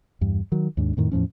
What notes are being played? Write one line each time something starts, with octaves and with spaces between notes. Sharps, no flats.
E2 G2
D#3 F#3
D#2 G#2 D4
F2 A2 D#3
E2 A2 F3 C#4